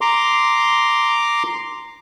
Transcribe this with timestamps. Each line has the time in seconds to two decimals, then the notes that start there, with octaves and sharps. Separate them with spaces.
0.01 A#5 C6 D6